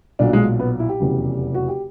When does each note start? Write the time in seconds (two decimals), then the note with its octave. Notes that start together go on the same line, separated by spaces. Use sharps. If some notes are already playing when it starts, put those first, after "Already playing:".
0.19 B1 A#2 F#3 D4
0.33 G#3
0.59 B3
0.80 E4
0.89 G4
1.00 F1 E2 C#3 F#3
1.54 F#4
1.68 G4